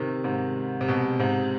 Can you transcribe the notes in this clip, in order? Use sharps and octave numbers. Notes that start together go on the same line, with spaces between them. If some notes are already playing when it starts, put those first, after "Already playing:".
Already playing: C3 D#3
G#2 C3
C3
B2
G#2 C3